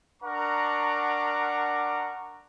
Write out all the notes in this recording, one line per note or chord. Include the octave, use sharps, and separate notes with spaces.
D4 A#4 F#5 A#5 C#6 D6